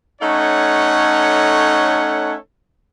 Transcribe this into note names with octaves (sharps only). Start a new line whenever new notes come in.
A3 C#4 D#4 A4 C#5 F#5